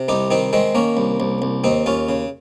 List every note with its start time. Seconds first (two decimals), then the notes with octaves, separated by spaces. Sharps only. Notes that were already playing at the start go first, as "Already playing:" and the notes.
Already playing: C3
0.08 C2 D#4 G4
0.31 D#3 C4 D#4
0.53 D#3 G#3 C4
0.75 D#3 A#3 C#4
0.97 C2
1.20 C2
1.42 C2
1.64 D#2 C4 D#4
1.86 D#2 C#4 F4
2.09 C#3